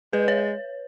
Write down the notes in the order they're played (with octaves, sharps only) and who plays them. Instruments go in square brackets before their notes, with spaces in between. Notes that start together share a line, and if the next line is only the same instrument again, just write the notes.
[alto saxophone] G#3 [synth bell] B4
[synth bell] C#5